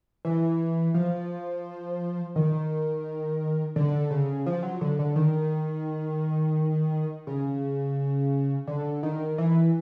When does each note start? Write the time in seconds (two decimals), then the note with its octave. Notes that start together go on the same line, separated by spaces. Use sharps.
0.25 E3
0.94 F3
2.36 D#3
3.76 D3
4.11 C#3
4.46 F3
4.63 F#3
4.81 D3
4.99 D3
5.16 D#3
7.27 C#3
8.67 D3
9.03 D#3
9.38 E3